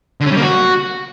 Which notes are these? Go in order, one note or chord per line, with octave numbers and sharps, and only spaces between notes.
D3
C#4
G3
A#3
F#4